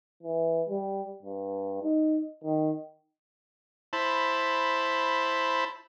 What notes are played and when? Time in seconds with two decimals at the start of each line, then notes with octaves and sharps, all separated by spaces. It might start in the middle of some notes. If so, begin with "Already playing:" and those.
0.23 E3
0.69 G3
1.23 G2
1.83 D#4
2.44 D#3
3.93 E4 C5 A5 B5